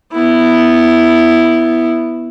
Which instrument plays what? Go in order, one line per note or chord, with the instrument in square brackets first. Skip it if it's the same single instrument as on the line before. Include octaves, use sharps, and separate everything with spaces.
[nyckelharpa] B3 E4